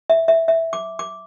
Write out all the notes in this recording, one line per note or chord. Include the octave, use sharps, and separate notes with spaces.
E5
E5
E5
D6
D6